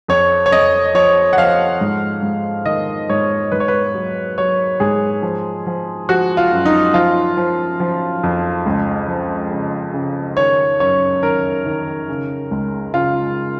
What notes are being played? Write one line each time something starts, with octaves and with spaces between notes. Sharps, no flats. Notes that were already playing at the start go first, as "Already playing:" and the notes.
F2 C#5
C#5
F2 D#5
F3 C#5
F#5
F3 F5
G#2
G#2
D#3 D#5
G#2 C#5
G#2 B4
C#5
B4
F#3
F#3 C#5
G#2 G#4
F3
F3
F3 F#4
F4
F#2
D#4
F3 F4
F3
F3
F2
C#2
F3
C#3
C#3
D#3 C#5
F#2 C#5
D#3 A#4
D#3
C#3
C#2
C#3 F4